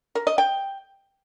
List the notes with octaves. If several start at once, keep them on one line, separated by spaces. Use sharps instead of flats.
A#4
D#5
G5